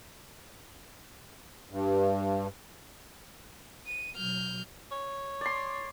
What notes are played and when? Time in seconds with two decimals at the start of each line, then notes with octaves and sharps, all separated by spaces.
1.71 G2
3.86 D#7
4.16 B2 F#3 F6 G6
4.91 C#5
5.41 D5 C6